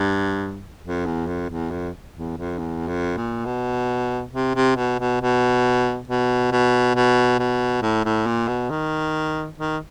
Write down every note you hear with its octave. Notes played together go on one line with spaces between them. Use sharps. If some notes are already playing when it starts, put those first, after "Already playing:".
Already playing: G2
F2
E2
F2
E2
F2
E2
F2
E2
F2
A#2
B2
C3
C3
B2
B2
B2
B2
B2
B2
B2
A2
A2
A#2
B2
D#3
D#3